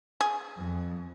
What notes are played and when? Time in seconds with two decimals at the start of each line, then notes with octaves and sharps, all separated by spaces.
0.21 G#4
0.58 F2